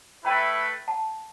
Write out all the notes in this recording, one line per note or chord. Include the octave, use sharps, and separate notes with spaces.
A3 E4 B4 G5 B5
F#5 A5